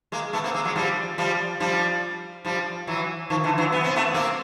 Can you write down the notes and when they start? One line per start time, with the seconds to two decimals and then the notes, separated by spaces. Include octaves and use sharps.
0.12 G#3 A#3
0.33 A3 B3
0.44 A#3 C4
0.54 G#3 A#3
0.65 F#3 G#3
0.76 F3 G3
1.18 F3 G3
1.60 F3 G3
2.45 F3 G3
2.87 E3 F#3
3.30 D#3 F3
3.44 D3 E3
3.58 E3 F#3
3.72 B3
3.84 C4
3.96 A3 B3
4.14 A#3 C4